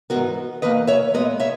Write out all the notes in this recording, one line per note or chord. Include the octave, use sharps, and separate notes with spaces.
G#2 E3 B3 F#4 A#4
E2 D#3 A#3 B4 D#5
C#5 E5
A#2 G#3 B3 B4 D#5
C#5 E5